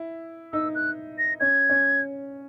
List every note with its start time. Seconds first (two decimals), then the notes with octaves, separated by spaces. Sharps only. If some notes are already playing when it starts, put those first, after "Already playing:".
Already playing: E4
0.53 D#4 E6
0.75 F#6
1.18 A#6
1.40 C#4 G#6
1.69 C#4